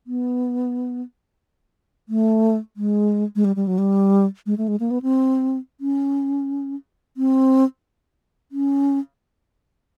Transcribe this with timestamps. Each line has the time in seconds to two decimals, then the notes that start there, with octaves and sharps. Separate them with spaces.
0.07 B3
2.09 A3
2.77 G#3
3.36 G#3
3.45 G3
3.56 G3
3.67 F#3
3.78 G3
4.46 G#3
4.58 A3
4.68 G#3
4.80 A#3
4.91 B3
5.02 C4
5.81 C#4
7.17 C4
8.52 C#4